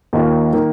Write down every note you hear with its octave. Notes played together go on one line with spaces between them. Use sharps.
D#2 D#3 A#3 F4
D#3 A#3